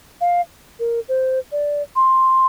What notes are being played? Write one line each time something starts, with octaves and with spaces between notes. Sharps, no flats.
F5
A#4
C5
D5
C6